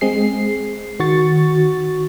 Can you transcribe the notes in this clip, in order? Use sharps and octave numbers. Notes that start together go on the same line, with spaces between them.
G#3 C4 G#4 C7
D#3 F#4 C#6 A6